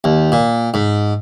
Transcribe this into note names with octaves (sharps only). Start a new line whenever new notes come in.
D#2
A#2
G#2